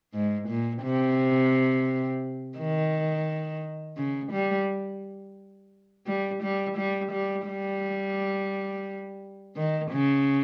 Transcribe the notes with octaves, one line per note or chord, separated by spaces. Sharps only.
G#2
A#2
C3
D#3
C#3
G3
G3
G3
G3
G3
G3
D#3
C#3